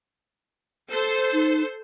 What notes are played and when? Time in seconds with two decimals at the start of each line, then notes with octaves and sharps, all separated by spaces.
0.91 A4 C5
1.33 D#4